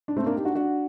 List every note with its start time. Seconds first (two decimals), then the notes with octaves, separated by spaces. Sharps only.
0.08 D4
0.17 A3 C4
0.26 A#3 D4
0.36 D#4 G4
0.45 D4 F#4
0.55 D4 F#4